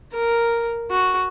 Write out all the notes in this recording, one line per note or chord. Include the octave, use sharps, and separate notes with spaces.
A#4
F#4